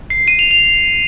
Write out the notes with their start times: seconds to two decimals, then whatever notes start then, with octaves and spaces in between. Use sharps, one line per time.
0.10 C7
0.28 D#7
0.39 F7
0.51 F7